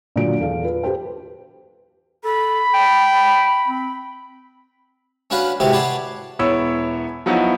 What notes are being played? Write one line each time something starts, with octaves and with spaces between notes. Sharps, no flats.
A#2 D3 F#3 F4 D7
E2 A4 F5
F4 B4
G4 A4 B4 C5 G5
A4 B5
G5
C4
C#4 D4 F#4 B4 F5 F#5
G#2 C3 E3 F#4 G4
B4 C#5 D5 F#5 A5 C6
E1 B3 E4 C#5 E6
F3 F#3 B3 D#4 E4 F#4